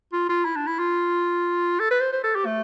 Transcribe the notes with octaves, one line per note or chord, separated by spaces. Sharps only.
F4
F4
E4
D4
E4
F4
A4
B4
C5
C5
A4
G4
A3